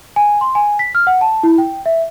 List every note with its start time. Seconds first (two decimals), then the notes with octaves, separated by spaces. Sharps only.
0.16 G#5
0.41 C6
0.55 G#5
0.79 B6
0.95 F6
1.07 F#5
1.21 A5
1.43 E4
1.58 G5
1.86 E5